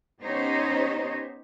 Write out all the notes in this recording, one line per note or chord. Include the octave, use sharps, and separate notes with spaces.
B3 C#4 D#4 G4 C5 C#5